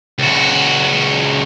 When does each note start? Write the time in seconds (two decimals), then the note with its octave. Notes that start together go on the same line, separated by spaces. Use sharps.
0.18 C#2 F#4